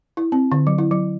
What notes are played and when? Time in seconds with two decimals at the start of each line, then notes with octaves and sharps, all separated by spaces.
0.17 E4
0.32 C4
0.52 D3
0.67 F#3
0.78 E4
0.91 F#3